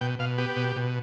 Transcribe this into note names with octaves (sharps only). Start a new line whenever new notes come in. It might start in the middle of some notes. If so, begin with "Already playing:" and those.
B2 G5
B2 F5
B3 G4
B2
B2